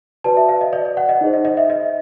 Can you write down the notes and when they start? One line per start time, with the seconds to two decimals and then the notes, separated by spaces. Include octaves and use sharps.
0.24 F#4 B4 D5 A5
0.37 E5
0.49 F5
0.61 D#5
0.73 D5
0.85 D5
0.97 F#5
1.09 D#5
1.21 D#4 G#4 C5
1.33 D#5
1.45 D#5
1.57 E5
1.70 D#5